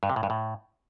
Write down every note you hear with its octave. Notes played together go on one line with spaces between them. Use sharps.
G2
C3
A2
G2
A2